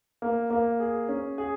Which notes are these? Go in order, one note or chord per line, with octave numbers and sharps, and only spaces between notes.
A#3
A#3
G#4
C#4
G#4